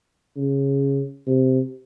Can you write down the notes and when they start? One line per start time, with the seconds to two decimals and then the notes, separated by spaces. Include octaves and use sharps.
0.37 C#3
1.27 C3